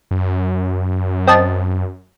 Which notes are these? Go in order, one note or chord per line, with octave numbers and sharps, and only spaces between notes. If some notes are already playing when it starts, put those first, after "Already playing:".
F#2
C4 D#5 A5